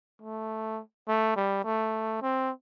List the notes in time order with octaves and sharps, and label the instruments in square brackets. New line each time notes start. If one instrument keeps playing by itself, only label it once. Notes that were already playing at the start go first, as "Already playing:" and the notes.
[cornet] A3
A3
G3
A3
C4